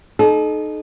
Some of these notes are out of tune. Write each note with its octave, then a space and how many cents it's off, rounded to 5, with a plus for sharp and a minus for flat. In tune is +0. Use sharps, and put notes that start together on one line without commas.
D#4 -20 A4 -40